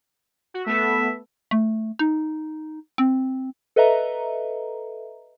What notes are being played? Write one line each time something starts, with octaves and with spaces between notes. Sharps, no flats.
F#4
A3 B3 A4 E5
A3
D#4
C4
A4 B4 D#5 E5 A#5